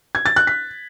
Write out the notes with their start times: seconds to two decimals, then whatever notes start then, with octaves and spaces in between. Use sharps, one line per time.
0.15 G#6
0.26 A6
0.36 F#6
0.47 B6